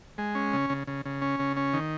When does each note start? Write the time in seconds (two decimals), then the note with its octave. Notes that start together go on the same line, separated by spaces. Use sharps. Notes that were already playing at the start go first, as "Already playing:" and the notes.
0.18 G#3
0.35 C#4
0.53 C#3
0.70 C#3
0.87 C#3
1.05 C#3
1.22 C#4
1.40 C#3
1.57 C#4
1.74 D#3